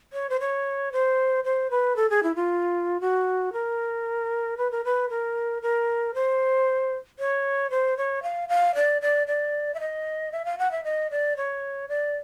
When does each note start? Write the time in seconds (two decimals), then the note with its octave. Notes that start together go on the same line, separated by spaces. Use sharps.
0.13 C#5
0.30 C5
0.40 C#5
0.92 C5
1.44 C5
1.71 B4
1.96 A4
2.10 G#4
2.23 E4
2.35 F4
3.01 F#4
3.53 A#4
4.57 B4
4.71 A#4
4.85 B4
5.10 A#4
5.62 A#4
6.14 C5
7.19 C#5
7.71 C5
7.97 C#5
8.23 F5
8.49 F5
8.75 D5
9.02 D5
9.27 D5
9.74 E5
9.80 D#5
10.32 E5
10.45 F5
10.58 F#5
10.72 E5
10.84 D#5
11.11 D5
11.37 C#5
11.89 D5